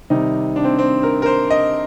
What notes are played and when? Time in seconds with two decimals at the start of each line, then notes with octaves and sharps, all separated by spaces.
0.10 C3 D#3 G3 D#4
0.56 D4
0.64 C4
0.79 C4
1.03 A#4
1.22 A#4
1.26 C5
1.50 D#5